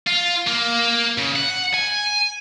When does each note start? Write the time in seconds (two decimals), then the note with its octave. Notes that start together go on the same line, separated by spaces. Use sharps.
0.07 F4
0.47 A#3
1.18 C#3
1.36 F#5
1.74 G#5